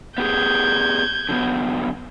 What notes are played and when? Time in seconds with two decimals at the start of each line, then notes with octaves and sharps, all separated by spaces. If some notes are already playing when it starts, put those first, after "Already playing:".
0.18 B3 G4 G#4 G6 G#6
1.29 D3 F#3 B3